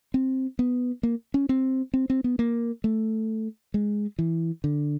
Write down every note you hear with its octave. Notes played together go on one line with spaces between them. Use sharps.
C4
B3
A#3
C#4
C4
C4
C4
B3
A#3
A3
G#3
E3
D3